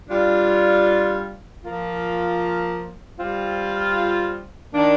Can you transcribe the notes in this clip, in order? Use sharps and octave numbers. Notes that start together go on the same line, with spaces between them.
G3 D4 F4
F3 A#3 F4
G3 C4 F4
D#3 A#3 D4